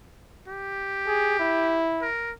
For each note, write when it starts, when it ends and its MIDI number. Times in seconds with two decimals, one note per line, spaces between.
0.47 1.89 67
1.07 1.34 68
1.39 2.07 64
2.02 2.32 70